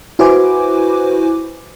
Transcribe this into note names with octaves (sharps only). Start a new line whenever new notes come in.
E4 F#4 B4 C5 G#5 D6